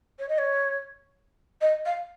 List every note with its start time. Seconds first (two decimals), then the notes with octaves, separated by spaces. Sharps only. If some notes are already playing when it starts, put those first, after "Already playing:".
0.19 C#5
0.29 D#5
0.38 C#5
1.61 D#5
1.86 F5